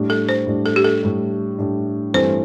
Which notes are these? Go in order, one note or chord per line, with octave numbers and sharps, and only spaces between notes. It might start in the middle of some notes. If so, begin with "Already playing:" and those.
Already playing: A2 G3 D4
A4
C5
A2 G3 D4
A4
G4
A4
A2 G3 D4
A2 G3 D4
G2 E3 A3 C4 E4 C5